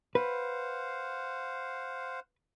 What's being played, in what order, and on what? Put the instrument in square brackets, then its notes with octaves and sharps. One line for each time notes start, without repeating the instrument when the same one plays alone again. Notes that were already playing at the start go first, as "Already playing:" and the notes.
[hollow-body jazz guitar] B4 [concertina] C5 F5 F#5